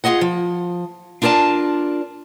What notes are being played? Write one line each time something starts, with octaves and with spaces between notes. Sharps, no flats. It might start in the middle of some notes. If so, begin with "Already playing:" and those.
F4 G4 G#4 D#5 F#5
F3
D4 F4 A#4 D5 A5